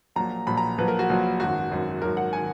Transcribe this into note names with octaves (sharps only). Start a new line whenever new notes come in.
A#1 A#2 F#3 A#5
A#1 A#2 F#3 B5
A#5
A#1 A#2 F#3 B4
A#4
F#4
A#1 A#2 F#3
G#1 F#2 D#3 F#4
G#1 F#2 D#3
G#1 F#2 D#3 A#4
F#5
G#5
D#3